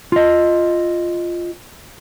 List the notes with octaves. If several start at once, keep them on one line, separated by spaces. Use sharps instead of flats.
F4 D#5